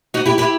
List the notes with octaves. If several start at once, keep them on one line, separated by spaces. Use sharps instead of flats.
D#4 F#4
E4 G4
E4 G4